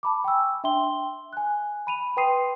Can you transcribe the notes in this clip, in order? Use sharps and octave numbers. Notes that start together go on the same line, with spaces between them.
A5 B5 D6
G5 G#5 C#6 E6
D4 E5 G5 C6 G7
G#5 F#6
B5 D#7 F7
B4 G5 C6 D#6 C7 D#7